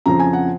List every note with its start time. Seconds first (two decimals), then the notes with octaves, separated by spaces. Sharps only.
0.06 F2 C#3 F3 A#5
0.19 G#5
0.33 F#5